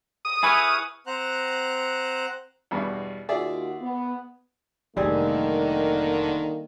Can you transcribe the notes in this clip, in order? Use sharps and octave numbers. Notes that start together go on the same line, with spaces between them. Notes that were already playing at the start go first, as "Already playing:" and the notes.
D#6
E4 G#4 B4 G#5 C#6 F6
C4 C5 F#5 A#5 F#6
E2 G2 B2
D#2 F4 F#4 G#4 D5 E5
B3
F1 D3 D#3 G3 A#3 C4 G#4